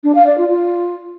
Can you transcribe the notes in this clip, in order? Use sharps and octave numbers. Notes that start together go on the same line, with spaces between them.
D4
F5
D5
F4
F4